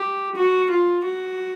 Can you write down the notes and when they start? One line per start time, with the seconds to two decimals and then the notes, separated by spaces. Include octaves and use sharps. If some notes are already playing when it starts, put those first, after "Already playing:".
Already playing: G4
0.36 F#4
0.70 F4
1.04 F#4